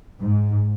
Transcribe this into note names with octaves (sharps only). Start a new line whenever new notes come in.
G#2